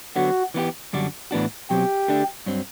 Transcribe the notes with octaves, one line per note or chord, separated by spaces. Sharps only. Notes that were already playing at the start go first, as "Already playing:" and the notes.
D3 F#3 B3 F#4
E3 B3 E4 G4
F#2 D3 G3 D4 F#4
A2 E3 B3 D4 F#4
B2 F#3 C4 G4
D3 A3 D4
G2 F#3 C4